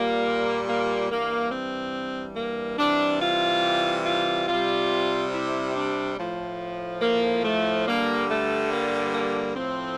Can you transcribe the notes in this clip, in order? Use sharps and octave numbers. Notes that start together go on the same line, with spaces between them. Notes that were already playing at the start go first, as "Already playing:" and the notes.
Already playing: A#2 G3 A#3
A#3
G2 E3 G3 A#3
C4
A#3
C3 E3 G3 D4
F4
F4
C3 G3 F4
E4
D4
A2 F3
A#3
A3
G2 D3 G3 A#3
A3
A#3
A#3
A2 F3 C4